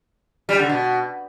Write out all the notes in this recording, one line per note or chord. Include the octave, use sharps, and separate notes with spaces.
G3
D3
B2